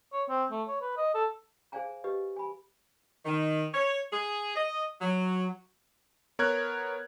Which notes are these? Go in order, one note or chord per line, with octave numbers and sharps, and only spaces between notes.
C#5
C4
A3
C#5
B4
D#5
A4
G#4 C5 D5 F5 G#5 A#5
G4 B4 D#5
G#5 B5
D#3
C#5
G#4
D#5
F#3
B3 A#4 C#5 F6 F#6 G#6